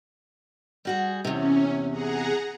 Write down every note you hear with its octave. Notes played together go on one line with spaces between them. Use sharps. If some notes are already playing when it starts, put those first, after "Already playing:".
G3 F#4 G#4
E2 C3 C#4
G#4 F#5 A#5